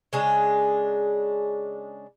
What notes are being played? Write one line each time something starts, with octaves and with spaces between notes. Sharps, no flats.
C#3 G#3 D4